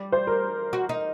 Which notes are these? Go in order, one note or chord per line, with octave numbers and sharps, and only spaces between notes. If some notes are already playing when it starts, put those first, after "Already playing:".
Already playing: G3 D5
C5
A#4
F#4
D#4